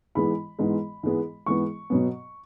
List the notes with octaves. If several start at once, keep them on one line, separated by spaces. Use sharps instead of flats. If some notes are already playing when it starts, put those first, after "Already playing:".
G#2 E3 G#3 B3 B5
G#2 E3 G#3 B3
G#2 E3 G#3 B3
G#2 E3 G#3 B3 C#6
B2 F#3 B3